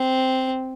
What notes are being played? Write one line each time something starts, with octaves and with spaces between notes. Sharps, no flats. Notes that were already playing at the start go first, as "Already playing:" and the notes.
Already playing: C4